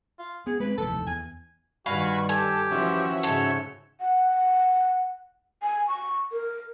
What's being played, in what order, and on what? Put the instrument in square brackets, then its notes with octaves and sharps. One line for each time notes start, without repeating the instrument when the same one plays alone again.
[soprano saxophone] F4
[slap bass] B3 [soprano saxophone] G#4
[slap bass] G#3 C4 [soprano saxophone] B4
[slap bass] F1 D#2 E3 [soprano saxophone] A4
[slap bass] E2 [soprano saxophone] G#5
[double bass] G2 D#3 [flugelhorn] F#4 [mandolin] F5 [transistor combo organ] G#5 B5 C#6
[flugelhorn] G4 [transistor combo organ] A4 [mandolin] G#5
[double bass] E3 F3 [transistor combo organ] C#4 F#4 E5
[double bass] G#2 C#3 [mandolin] A4 C5 C#5
[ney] F#5
G#5
C#6
A#4